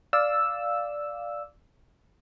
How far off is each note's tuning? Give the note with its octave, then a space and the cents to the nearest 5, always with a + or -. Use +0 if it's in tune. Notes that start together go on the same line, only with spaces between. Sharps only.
D5 +0 F5 +0 E6 +0